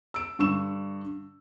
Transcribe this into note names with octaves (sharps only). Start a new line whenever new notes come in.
E6 D7
G2 D3 C#6 E6 E7